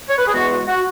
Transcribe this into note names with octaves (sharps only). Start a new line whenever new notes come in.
C#5
B4
G#4
E2 E3 G#3 B3 F#4
F#4
F#4